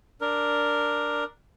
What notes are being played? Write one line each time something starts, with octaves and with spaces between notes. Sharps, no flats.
D4 A#4